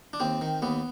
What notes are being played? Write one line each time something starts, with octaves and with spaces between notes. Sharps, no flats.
D4
D#2 C4
D#3
D#2 B3